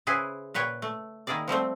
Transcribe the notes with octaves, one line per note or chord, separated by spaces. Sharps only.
C#3 E4 G#4 B4 C5
A#2 B4 C#5 G5
A3
D#3 A#3 E4 G#4 D5
F3 G3 A3 C4